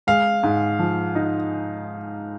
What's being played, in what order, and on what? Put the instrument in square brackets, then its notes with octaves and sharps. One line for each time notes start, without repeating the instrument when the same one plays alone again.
[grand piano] G#3 [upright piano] F5
[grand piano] G#2
F3
D#4